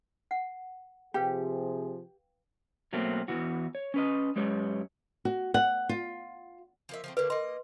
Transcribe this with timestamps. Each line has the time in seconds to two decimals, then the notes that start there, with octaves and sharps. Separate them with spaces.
0.31 F#5
1.14 C3 F3 G4 G#4 B4 F5 G5
2.93 B2 F#3 A3 A#3 C4
3.28 E2 E3 F#4
3.75 C#5
3.94 C#4 B4 D#5
4.36 F#2 G#3 G4 B4 C#5
5.25 F#4
5.54 F#5
5.89 F4
6.89 F3 A#3 E5
7.04 F3 A3 C4
7.17 D3 A3 A#3 B4
7.30 A#3 D#5 C6